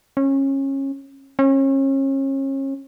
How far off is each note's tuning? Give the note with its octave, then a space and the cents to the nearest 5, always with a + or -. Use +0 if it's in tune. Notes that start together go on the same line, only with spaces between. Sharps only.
C#4 -25
C#4 -35